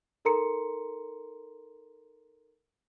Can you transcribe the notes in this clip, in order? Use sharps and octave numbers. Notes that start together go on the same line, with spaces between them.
D#4 A4 A#4 A#5 C6 C#7